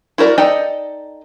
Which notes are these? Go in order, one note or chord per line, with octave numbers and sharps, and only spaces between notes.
E4 F#4 A#4 D5
D#4 A4 D5 D#5 G5